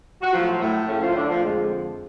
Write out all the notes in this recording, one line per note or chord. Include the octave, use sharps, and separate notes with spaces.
F#4
A2 F3 F#3 F4
A2 A3
A2 C#3 F#3 C#4
F3 F4
D3 D4
F3 F4
F2 D3 F3 G#3